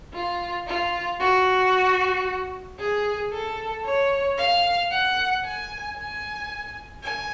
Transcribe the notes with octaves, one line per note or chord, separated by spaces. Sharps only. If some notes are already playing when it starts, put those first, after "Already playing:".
F4
F4
F#4
G#4
A4
C#5
F5
F#5
G#5
G#5
G#5